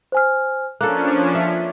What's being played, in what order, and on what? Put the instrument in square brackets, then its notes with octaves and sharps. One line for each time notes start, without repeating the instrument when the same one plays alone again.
[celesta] C5 G#5 F6
[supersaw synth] F3 C#4 D4 [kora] A#3 A4 [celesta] F#6
[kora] E5